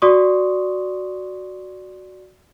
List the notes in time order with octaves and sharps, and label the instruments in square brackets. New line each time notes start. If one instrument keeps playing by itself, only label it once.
[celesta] F#4 D5 C6 C#6 D#6